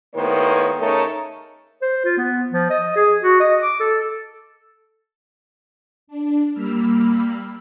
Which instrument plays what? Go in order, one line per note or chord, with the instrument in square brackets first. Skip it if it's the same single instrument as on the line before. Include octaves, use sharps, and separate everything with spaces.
[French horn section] D#2 A2 D#3 B3 C5 C#5
C#3 A3 D#4 A4 A#4 C#5
[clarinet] C5
F4
B3
F3
D#5
G#4
F#4
D#5
D6
A4
[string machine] D4
G3 A#3 B5 E6 F6